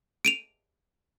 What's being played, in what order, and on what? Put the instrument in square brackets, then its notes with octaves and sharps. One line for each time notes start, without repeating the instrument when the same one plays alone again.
[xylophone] D7 D#7 F7